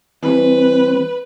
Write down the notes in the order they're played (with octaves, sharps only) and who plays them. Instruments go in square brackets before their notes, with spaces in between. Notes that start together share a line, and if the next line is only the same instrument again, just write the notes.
[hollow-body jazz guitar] E3 G3 [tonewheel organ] C4 [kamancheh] B4